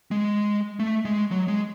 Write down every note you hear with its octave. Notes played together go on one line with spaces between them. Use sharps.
G#3
A3
G#3
F#3
G#3